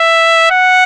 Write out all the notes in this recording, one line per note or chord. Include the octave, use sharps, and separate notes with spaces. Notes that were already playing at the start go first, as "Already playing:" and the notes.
Already playing: E5
F#5